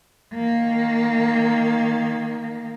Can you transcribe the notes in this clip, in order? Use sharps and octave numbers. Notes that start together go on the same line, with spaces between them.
D#3 A#3